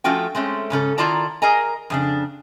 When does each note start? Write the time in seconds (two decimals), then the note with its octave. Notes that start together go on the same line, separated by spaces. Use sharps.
0.04 F3 A3 C#4 F4 F#4 G5
0.35 G#3 A3 C4 C#4
0.70 G#2 C#3 C#4 A4
0.98 D#3 E4 F4 D5 A5 A#5
1.42 G#4 A#4 D#5 G#5 A#5
1.90 F2 C#3 D4